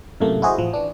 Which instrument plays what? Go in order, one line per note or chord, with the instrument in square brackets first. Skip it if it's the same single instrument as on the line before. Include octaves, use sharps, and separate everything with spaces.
[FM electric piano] F#2 A2 C3 A3 A#3
E4 F#4 G#4 C5 D#5
A1 F3
E3 D4